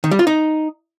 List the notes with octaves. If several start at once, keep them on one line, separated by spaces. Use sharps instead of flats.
D#3
G3
F4
D#4